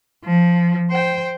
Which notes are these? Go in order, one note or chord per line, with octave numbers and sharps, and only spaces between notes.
F3
C5 G5